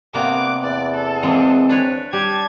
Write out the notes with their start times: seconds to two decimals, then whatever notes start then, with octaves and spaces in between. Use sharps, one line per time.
0.14 G2 C3 A#3 B3 D6 F#6
0.63 E2 D5
0.94 A4
1.23 E3 G#3 A#3 C4
1.69 D4 B4 C#5
2.13 G3 G4 A5 G#6